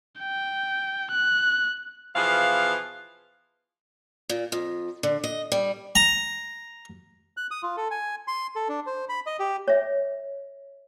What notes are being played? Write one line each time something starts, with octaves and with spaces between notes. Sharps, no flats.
G5
F#6
B2 E3 F3 B3 G#4 F5
A#2
F2
D3
D#5
G3
A#5
F#6
D#6
F4
A4
G#5
C6
A4
D4
C5
B5
D#5
G4
C#5 E5